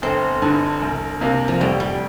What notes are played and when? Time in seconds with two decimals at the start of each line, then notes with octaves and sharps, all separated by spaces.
0.02 G1 C4
0.42 G2 D3
0.82 C2
1.21 C3 A#3
1.48 F3
1.60 F1 G3
1.80 G3